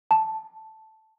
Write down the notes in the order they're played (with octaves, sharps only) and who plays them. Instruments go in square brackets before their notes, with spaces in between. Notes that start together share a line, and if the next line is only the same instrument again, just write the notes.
[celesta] A5